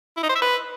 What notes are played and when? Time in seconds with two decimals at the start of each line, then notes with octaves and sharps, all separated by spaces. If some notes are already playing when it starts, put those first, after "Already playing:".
0.17 E4
0.23 D#4
0.29 C5
0.35 E5
0.41 B4